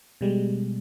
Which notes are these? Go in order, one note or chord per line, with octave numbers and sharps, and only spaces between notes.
B2 G3 G#3